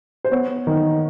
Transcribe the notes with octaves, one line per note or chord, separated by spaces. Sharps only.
C5
B3 C#5
D#3